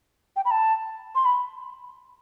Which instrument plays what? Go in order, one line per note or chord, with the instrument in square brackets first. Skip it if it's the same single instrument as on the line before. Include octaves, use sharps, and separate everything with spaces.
[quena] G5
B5
A5
C6
B5